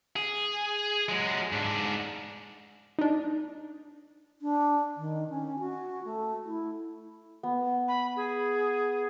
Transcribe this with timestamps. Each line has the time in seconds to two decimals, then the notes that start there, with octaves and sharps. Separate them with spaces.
0.16 G#4
1.09 F#3 G#3
1.53 G#2 D4
2.99 D4 D#4
4.42 D4
4.97 D#3
5.30 C#4
5.59 F#4
6.05 A3
6.45 E4
7.43 B3
7.88 B5
8.16 G#4